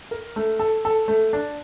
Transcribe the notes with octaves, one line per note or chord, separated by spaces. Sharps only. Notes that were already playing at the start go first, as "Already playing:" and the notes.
A#4
A3
A4
A4
A3
D4